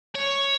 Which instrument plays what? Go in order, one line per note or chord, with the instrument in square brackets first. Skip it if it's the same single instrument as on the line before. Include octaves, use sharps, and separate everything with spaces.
[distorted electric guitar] C#5